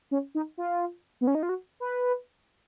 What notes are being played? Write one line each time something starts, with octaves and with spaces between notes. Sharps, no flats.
C#4
D#4
F4
B3
C#4
D#4
F4
F#4
B4